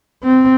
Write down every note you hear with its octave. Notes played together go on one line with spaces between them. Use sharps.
C4